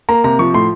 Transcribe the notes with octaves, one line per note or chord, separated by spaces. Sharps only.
A#3 A#5
C3 A#5
F3 C#6
A2 C6